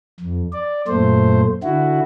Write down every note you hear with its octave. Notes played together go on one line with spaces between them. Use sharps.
F2
D5
F#2 A#2 A3 C5
D3 E4 F#4